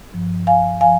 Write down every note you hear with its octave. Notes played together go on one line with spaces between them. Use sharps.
G2 F3
F5 G#5
F3 F5 G#5